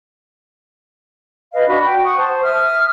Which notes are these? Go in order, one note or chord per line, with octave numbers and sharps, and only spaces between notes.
B4 D#5 F5
D4 F#4 B5
G5
F#5 C#6 D#6
C5 A5
E5 D#6 F6